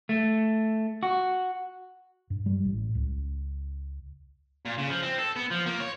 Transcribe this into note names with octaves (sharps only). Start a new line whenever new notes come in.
A3
F#4
G2
G3
A1
C#2
A#2
C#3
F3
C4
A4
B3
F3
A#3
C#5